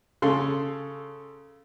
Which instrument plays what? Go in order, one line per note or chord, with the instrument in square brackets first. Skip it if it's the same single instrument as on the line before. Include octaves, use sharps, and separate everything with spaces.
[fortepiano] C#3 A4 C6